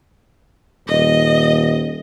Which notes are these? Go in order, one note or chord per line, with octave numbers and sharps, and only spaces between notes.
D#1 D#5